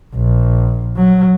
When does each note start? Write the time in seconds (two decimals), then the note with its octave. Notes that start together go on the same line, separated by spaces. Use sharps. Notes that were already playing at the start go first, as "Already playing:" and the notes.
0.16 A#1
0.96 F#3